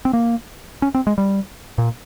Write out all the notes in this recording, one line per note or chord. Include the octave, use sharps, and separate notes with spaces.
C4
A#3
C#4
C4
G#3
G3
A#2